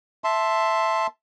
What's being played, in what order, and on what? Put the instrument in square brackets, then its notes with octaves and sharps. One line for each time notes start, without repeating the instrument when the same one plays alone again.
[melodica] E5 A5 C6